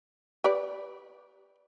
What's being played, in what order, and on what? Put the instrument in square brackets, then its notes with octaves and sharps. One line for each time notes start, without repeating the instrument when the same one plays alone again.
[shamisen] G4 B4 D5